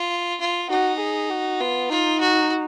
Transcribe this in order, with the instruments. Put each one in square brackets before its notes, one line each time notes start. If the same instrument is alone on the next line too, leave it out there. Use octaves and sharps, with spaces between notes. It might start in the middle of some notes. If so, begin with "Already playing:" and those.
Already playing: [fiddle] F4
F4
[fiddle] D#4 [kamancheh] F#4
[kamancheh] G#4
F#4
[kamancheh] B3 [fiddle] F4
[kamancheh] D#4 [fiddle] F4
[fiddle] F#4